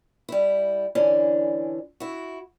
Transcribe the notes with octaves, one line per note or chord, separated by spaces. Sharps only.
G3 E4
D3 E3 C#4 D4
E4 F#4